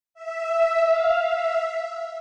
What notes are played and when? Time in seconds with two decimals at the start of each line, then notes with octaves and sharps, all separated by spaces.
0.14 E5
0.86 F5
1.21 E5